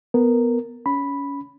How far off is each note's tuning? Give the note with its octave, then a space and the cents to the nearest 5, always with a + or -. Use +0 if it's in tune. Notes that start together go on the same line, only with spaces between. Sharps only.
B3 +0 A#4 -10
C#4 +25 B5 +0